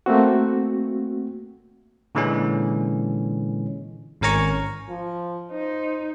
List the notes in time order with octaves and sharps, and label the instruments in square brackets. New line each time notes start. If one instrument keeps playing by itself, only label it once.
[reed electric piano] A3 A#3 C4 F#4
[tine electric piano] A#2 D3 E3 G#3 C#4
G#1 C#4 A#4 G#5 A#5 C#6
[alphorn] F3
[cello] D#4 [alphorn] C5